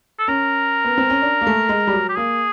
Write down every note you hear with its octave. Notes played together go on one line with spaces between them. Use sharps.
A4
C#4 A#4
B3
C4
C#4
D4
A#3
A3
G#3
G3
F#3
G4
A#3 G#4